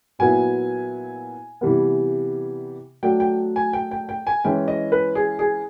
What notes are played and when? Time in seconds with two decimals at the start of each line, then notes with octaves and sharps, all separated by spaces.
0.19 A#2 F#3 B3 E4 G#5
1.61 C3 E3 G3 B3
3.03 F#3 A3 D4 G5
3.20 G5
3.56 G#5
3.73 G5
3.91 G5
4.09 G5
4.27 G#5
4.44 E3 G#3 C#4 E4 G5
4.68 D#5
4.92 B4
5.15 G#4
5.39 G#4